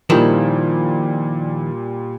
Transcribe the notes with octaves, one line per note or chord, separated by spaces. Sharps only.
A#2 D#3 F3 G3 E4